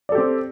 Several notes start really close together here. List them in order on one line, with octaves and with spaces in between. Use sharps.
D5 A4 G4 C4